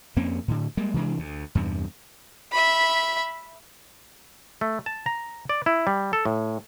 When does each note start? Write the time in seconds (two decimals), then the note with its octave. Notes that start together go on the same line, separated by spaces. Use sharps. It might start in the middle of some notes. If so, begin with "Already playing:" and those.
0.17 F2 A#3 C4 C#4
0.48 A2 D3
0.77 G3 G#3 A#3
0.94 C3 E3 G#3 D4
1.19 D2
1.55 E2 G2 C3
2.52 E5 B5
4.61 A3
4.86 A5
5.06 A#5
5.49 D5
5.66 E4
5.87 G3
6.13 A4
6.26 A2